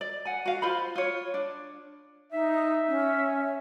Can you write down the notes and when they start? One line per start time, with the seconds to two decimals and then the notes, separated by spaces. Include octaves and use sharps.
0.01 D5
0.25 F#5 G#5
0.46 F#4 F5
0.62 F4 C5 B5
0.96 F4 C#5
1.34 D4
2.32 D#4 E5
2.88 C#4